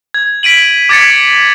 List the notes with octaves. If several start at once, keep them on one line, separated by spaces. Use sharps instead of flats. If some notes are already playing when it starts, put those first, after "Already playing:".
G#6
B6 D7 D#7 F#7
D6 G#6 A6 B6 C#7